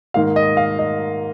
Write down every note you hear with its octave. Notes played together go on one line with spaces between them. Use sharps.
G#2 D#3 A#3 F5
D#5
F5
D#5